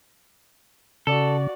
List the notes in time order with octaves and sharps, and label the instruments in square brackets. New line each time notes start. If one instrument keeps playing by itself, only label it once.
[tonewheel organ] C#3 [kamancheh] F#4 D5 [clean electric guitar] A4